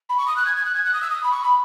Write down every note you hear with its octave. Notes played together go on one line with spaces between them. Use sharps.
B5
C#6
D#6
F#6
G#6
G#6
F#6
G#6
F#6
D#6
E6
D#6
B5
C#6
B5